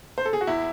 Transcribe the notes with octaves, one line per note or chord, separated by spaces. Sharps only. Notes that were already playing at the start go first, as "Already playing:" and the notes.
C5
A4
G#4
F#4
E2 E4